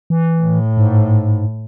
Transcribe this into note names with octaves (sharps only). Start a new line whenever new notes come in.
E3
A2
G#2